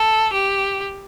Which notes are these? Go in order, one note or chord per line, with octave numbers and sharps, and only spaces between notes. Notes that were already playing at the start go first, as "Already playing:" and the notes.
Already playing: A4
G4